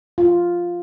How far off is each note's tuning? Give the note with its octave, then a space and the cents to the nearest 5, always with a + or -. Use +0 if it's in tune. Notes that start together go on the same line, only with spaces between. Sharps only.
F4 +0 F5 +0